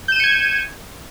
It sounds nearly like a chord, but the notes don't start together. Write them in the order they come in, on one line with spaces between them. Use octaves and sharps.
G6 E7 D#7 C#7 G#6